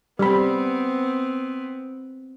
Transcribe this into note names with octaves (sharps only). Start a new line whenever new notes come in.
G3 B3 C4 B5